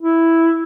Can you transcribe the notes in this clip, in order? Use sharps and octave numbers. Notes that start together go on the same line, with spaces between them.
E4